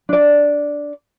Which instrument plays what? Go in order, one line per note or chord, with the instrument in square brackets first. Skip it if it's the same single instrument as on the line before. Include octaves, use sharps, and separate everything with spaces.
[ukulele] D4 D5